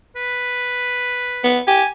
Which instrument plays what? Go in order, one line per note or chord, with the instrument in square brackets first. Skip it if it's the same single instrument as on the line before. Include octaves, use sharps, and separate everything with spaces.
[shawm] B4
[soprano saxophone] B3
[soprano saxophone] G4 [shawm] G#5